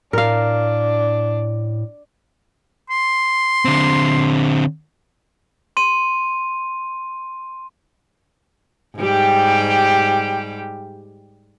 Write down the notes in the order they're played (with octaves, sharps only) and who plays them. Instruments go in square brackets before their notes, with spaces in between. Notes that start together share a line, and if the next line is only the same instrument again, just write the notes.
[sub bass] A2 [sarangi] D4 [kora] A#4 F5
[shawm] C6
[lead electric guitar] D3 C4
[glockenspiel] C6 D#7
[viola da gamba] G#2 G3 G4